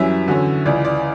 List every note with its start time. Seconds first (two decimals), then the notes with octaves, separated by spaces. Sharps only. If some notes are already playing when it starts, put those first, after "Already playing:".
Already playing: F#2 E3 G3 C#4 E5
0.27 E2 D3 F#3 C#4
0.66 C#2 C#3 E3 D5
0.85 D5